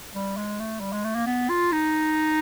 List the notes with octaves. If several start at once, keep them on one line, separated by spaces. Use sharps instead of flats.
G3
G#3
A3
G3
G#3
A3
A#3
B3
F4
D#4